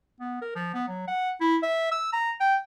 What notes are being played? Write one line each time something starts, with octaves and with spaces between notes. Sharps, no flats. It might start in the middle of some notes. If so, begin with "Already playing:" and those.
B3
A#4
F3
B3
F#3
F#5
E4
E5
E6
A#5
G5